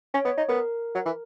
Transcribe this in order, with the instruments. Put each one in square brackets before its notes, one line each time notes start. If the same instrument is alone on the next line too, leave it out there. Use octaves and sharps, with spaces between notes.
[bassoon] C#4 [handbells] C#5
[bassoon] B3
D#4
[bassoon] B3 [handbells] A#4
[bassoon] F#3
E3